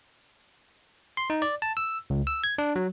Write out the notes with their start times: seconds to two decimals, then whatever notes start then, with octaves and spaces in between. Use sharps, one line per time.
1.17 C6
1.30 D#4
1.42 D5
1.62 A5
1.77 E6
2.10 C#2
2.27 E6
2.44 G#6
2.58 D4
2.76 F#3